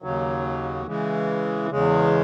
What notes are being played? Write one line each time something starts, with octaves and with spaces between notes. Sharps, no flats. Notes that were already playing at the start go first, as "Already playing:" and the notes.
D#2 C#3 F#3
C#3 E3 G#3
E2 C#3 G#3